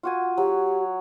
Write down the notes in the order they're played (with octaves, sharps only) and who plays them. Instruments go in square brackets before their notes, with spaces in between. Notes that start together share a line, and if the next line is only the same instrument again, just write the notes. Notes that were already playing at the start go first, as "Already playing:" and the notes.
[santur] F4 F#4 G#5
[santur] F#3 [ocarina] G4